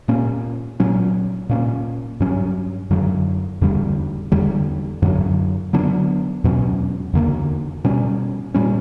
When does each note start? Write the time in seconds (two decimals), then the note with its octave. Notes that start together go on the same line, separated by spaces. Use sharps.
0.08 A#2 A#3 C#4
0.80 A#2 F#3 C#4
1.49 A#2 A#3 C#4
2.20 G2 F#3 C#4
2.90 F#2 D3 F#3
3.61 E2 D3 G3
4.32 E2 D3 G3
5.02 F#2 D3 F#3
5.73 D3 F#3 B3 D4
6.44 E2 B2 F#3 C#4
7.13 E2 D3 A#3
7.84 B2 G3 C#4
8.55 A#2 G3 C#4